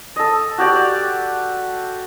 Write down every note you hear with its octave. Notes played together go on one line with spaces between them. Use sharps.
A4 D#5
F#4 G4 D5